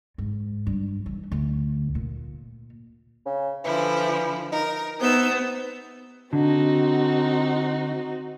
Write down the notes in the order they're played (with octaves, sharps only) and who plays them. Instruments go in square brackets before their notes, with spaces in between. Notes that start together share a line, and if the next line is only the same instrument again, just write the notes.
[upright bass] G#2
G2
E3
D2
A#2
[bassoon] C#3
[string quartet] D3 F3 E4 [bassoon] E3
[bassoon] D#4 [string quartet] A#4
[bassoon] C3 [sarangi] B3 [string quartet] D#4 E6 G6
[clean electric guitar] D3 [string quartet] C4 D#4 F#4